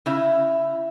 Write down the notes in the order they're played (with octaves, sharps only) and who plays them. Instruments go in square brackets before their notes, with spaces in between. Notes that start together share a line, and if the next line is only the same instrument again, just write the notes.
[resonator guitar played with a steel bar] C#3 E4